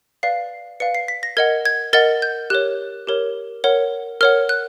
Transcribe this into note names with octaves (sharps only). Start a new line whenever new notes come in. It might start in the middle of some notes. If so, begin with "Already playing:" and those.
B4 D5 F5 C7
B4 D5 F5 C#7
C7
B6
A#6
A#4 D#5 F#5 G#6
G#6
A#4 D#5 F#5 A6
G6
G4 A#4 C#5 F#6
G4 A#4 C#5
A#4 C#5 F#5
A#4 C#5 F#5 F6
F#6